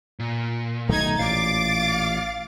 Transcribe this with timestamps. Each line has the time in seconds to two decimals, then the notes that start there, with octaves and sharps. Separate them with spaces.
0.19 A#2
0.89 B1 D#3 A3 D#4 G#6
1.19 A1 A#2 F5 D6 A6